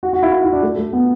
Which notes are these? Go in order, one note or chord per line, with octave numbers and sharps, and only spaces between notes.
F#4
F#4
E4
E4
E4
D4
A3
A3
B3